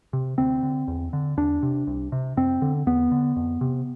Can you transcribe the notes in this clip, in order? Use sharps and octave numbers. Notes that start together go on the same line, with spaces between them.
C3
D2 C4
D3
E2
D3
E2 D4
C3
C2
C3
F2 C4
D3
E2 B3
D3
F2
C3